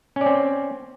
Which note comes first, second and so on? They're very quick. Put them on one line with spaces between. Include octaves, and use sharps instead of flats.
C#4 D5 C4